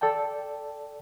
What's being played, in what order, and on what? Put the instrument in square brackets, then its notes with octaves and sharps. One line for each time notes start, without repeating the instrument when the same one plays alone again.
[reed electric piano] A4 D5 G5 A5